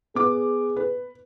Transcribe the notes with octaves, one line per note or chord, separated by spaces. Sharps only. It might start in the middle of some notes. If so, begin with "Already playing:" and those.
B3 G#4 D6
B4